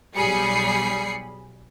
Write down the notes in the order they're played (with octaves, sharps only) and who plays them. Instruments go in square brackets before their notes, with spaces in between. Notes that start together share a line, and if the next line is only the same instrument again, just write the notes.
[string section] B1 G3 G#4 B5 C7 C#7